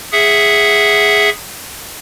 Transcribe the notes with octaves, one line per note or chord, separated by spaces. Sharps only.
G#4 E5 F#5